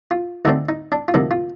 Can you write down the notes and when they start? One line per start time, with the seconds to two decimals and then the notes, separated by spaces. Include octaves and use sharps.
0.11 F4
0.45 D2 D3 A3 C4 D#4
0.69 D#4
0.92 D4
1.08 F4
1.14 D2 C3 F3 A#3 D#4
1.31 F4